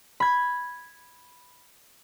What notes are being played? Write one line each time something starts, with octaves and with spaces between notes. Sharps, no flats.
B5 G#6